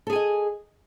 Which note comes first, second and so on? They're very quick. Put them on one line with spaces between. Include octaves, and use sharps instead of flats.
A4 G#4 G#5 D#5